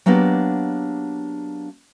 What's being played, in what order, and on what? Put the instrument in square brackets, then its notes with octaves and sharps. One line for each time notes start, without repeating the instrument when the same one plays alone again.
[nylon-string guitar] F#3 A#3 B3 D4 G4